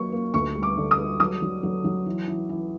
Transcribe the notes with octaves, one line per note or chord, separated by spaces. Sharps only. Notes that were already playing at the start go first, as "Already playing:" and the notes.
Already playing: F#3 A#3 C#6
A#3
D2 C#6
G3
D6
D3
D#6
G3
F#3 D#6
F#3
F#3
F#3
E3
E3
E3